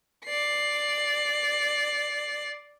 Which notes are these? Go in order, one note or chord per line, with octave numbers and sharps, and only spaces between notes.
D5 C7